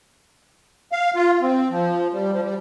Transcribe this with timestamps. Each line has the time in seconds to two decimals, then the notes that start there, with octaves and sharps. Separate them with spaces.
0.92 F5
1.16 F4
1.42 C4
1.70 F3
2.12 G3
2.32 F3
2.43 G3